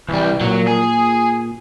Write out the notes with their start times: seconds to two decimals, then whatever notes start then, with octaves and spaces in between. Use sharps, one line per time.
0.09 C2 E3 G3
0.41 A#2 F#3
0.68 G#4